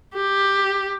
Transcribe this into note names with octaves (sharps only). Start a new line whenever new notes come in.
G4